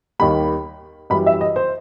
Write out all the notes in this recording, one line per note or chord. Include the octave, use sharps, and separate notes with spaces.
D#2 D#3 G3 B5
F#2 E3 G3 B5
E5
D#5
C5